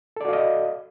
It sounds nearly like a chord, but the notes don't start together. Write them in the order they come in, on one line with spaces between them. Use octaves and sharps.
A4 D5 F#4 F5 D#5